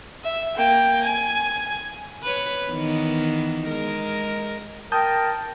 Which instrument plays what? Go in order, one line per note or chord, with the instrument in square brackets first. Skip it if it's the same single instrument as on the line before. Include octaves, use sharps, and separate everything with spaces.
[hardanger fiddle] E5
A#3 G5
G#5
[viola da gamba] B4 C#5
D#3 E3 B3
G#3 A#4
[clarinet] A#4 [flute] G5 [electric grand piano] A5 D#6 G6